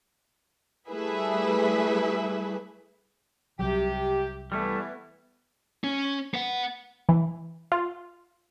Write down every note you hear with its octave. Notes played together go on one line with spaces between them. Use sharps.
G3 A3 E4 G#4 B4 E5
C2 C3 F#3 G4
E3 G3 A3 B3
C#4
B3 F#5
E3
F4